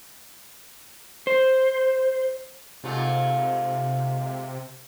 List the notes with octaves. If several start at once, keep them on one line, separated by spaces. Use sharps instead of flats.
C5
G#2 C3 A3 F4